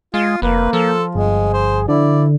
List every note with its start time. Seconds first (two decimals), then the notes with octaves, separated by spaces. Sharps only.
0.14 G#3 F4
0.42 F1 A#3 B4
0.73 F3 A4
1.15 G1 G#3 G#4
1.54 C5
1.88 D3 E4 D5